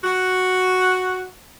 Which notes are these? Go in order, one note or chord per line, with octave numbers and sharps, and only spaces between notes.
F#4